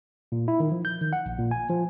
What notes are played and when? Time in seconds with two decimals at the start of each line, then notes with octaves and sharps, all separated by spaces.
0.32 A#2
0.48 E4
0.60 D#3
0.72 F3
0.85 G6
1.01 D#3
1.13 F#5
1.26 A#1
1.39 A#2
1.51 G#5
1.70 F3